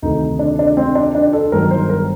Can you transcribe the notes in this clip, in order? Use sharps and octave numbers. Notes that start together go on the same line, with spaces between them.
D2 C3 D#3 A3 D#4
D4
D4
C4
D4
D4
A4
G1 G2 D#3 F#3 A#4
C5
A#4